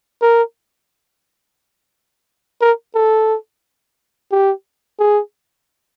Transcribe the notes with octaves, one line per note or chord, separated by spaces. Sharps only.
A#4
A#4
A4
G4
G#4